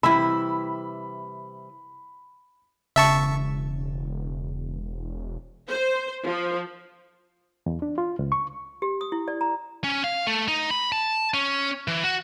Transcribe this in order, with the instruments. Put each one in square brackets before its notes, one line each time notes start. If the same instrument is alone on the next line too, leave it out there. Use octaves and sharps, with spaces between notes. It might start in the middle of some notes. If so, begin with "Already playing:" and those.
[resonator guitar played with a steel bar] C3 E3 G3 [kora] E4 E5 [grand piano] B5
[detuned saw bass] E1 [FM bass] C#3 [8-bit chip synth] E5 A5 C#6
[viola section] C5
F3
[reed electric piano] E2
D4
F4
C#2
C#6
[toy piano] G4
D#6
E4
D5
A#5
[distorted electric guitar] C#4
F5
A3
D#4
B5
A5
C#4
E3
F#4